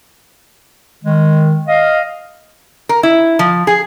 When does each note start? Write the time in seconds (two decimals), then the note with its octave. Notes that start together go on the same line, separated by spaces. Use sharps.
1.04 D#3 G#3
1.68 D#5 F5
2.89 A#4
3.03 E4
3.39 F3
3.67 G#4